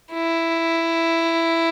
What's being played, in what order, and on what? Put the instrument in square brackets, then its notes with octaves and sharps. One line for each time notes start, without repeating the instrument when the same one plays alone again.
[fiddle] E4